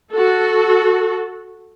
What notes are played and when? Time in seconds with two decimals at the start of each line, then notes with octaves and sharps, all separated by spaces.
0.11 F#4 A4